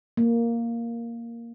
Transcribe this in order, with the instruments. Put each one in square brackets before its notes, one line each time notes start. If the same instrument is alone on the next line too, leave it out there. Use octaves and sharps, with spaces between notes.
[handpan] A#3